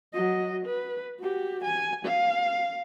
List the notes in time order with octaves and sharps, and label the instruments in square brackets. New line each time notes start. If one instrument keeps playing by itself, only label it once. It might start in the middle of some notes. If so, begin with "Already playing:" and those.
[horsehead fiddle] F#3 D#5
B4
F#4 G4
G#5
F5